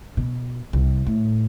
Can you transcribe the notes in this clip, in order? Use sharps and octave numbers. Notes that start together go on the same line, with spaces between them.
B2
C2
A2